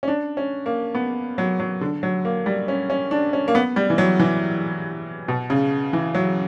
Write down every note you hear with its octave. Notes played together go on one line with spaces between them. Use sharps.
C#4
D4
C#4
A#3
B3
F#3
F#3
D3
F#3
A#3
G3
C#4
C#4
D4
C#4
A#3
B3
G3
E3
F#3
E3
B2
C#3
E3
F#3